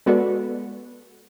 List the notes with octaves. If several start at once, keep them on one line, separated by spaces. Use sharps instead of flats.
G#3 B3 F#4 A4 B4 D5